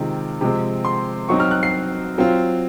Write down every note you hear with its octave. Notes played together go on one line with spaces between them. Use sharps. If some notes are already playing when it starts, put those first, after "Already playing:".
Already playing: C3 D#3 G#3 C4 F4
C3 F3 G#3 C4
C6
F#3 C4 D#4 C#6
F6
F#6
C7
F#3 C4 F4